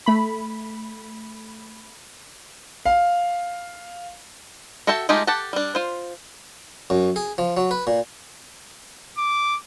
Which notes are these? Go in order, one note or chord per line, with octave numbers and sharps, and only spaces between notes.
A3 B5
F5
F#4 A4 E5 G5 A5
G#3 A3 D#4 F4 G4
G4 A4 F#5 A5
G3 D4
F4 C5
F#2
G#4
F3
F#3
B4
A#2
D6